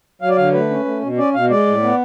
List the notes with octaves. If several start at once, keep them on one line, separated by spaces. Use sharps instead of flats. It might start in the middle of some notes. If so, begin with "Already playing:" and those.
F#3 F5
D5
D3 F5
A3 B4
C#4
A3
B2
C#4 D5
B2 F5
G#3 D5
A2
B3